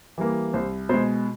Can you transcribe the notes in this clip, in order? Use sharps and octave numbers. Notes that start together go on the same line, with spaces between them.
E3 G3 A#3
C2 C5
B2 G#3 C5